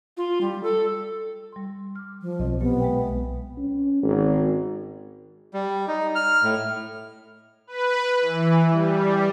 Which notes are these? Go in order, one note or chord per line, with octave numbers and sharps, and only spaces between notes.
F4
G3
A4
G3 C6
D6 F6
F3
B1 C4 D#5
A#2 F#3 B3 G4
G#3 E5 G5
C#4
G#1
G3
D#4
F6
A2
B4
E3
G3